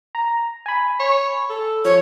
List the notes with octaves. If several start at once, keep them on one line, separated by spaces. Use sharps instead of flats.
A#5
G#5 B5
C#5
A4
F3 C#5